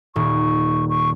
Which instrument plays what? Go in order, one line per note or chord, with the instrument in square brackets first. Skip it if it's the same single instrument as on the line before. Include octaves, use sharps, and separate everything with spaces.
[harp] D#1 [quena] C#6
[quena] C#6